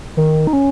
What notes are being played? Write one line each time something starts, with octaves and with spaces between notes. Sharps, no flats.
D#3
D#4
C#4